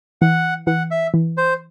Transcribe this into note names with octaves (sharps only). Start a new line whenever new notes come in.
E3 F#5
E3 F#5
E5
E3
C5